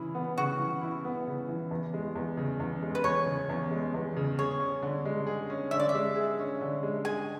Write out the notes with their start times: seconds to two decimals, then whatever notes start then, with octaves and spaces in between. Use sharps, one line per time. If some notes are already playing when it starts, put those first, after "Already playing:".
Already playing: C#3 E3 E4
0.15 B3
0.38 C#3 F#4
0.59 E3
0.81 E4
1.05 B3
1.27 C#3
1.48 E3
1.71 E2
1.94 G#3
2.15 E2
2.37 C#3
2.60 E2
2.82 G#3
2.95 B4
3.04 E2 C#5
3.26 C#3
3.49 E2
3.71 G#3
3.94 E2
4.16 C#3
4.39 G#4 C#5
4.60 C#4
4.83 D3
5.05 G#3
5.27 G#4
5.50 C#4
5.71 D3 E5
5.80 D5
5.89 E5
5.94 G#3
6.16 G#4
6.39 C#4
6.61 D3
6.83 G#3
7.05 G#4 G#5